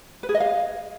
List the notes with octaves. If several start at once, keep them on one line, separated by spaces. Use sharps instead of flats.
B4
G#4
D#5
F5